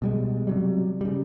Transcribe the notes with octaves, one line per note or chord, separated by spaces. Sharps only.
B2 G3 G#3
C3 F#3 G3
C#3 G3